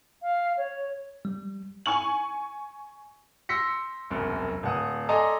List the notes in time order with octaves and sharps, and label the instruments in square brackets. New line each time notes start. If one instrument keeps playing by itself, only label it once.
[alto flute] F5
C#5
[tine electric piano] G3
[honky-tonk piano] G#5 C#6 F#7
[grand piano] C6 E6 A#6 B6 C#7
E1 C2 F#2
D1 F#5 D#6
A4 D5 D#5 G#5 A#5 C6